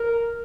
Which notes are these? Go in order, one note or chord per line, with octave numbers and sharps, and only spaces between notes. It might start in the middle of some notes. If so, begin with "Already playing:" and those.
Already playing: A#4